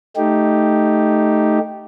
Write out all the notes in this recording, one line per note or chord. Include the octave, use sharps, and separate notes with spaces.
A3 D#4 G4